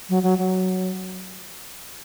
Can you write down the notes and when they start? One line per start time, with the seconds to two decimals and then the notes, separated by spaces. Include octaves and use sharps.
0.09 F#3
0.23 F#3
0.38 F#3